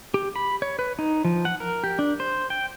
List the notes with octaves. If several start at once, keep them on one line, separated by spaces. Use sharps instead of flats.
G4
B5
C#5
B4
D#4
F3
F#5
A#4
G4
D4
C5
G5